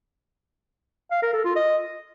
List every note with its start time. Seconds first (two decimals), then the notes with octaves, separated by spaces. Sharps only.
1.11 F5
1.22 A#4
1.33 A4
1.45 F4
1.56 D#5